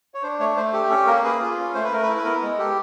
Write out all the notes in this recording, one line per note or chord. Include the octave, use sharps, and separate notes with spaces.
C#5
D4 C5
A3 C#5
A3 C5
G4 A4
C#4 A4
A#3 A#4
G#4 B4
F4
C#4
A3 C5
B4
A3 A#4
B4
E4
B4
B3 A#4
G#3
G4 A4